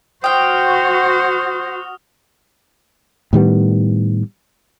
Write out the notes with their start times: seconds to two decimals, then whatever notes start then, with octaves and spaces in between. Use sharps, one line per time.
0.24 F#4 C5 F5 G5 D#6 F6
3.33 A2 D#3 G3 B3